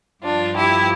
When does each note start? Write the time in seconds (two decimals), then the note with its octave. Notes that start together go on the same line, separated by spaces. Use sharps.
0.23 G2 F3 D4 F4
0.56 E4 G4